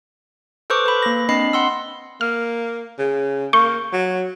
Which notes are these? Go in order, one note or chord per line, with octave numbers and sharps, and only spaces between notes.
A4 B4 C5 C#6 D6
B4 B5
A#3 A#6
C4 D4 D#5 B5 C7
F#5 C6 E6
A#3 F6
C#3
A#3 C#6 G6
F#3